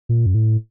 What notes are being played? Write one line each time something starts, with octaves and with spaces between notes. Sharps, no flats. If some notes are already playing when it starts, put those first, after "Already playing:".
A#2
F#2
A2